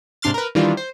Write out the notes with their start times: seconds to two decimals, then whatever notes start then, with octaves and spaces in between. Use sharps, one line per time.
0.22 G#2 C3 D4 C6 F6 A6
0.34 A#4 B4
0.55 D#3 E3 G3 D4 F4
0.77 C5